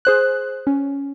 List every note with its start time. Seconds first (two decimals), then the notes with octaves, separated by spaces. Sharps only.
0.05 G#4 C5 F#6
0.67 C#4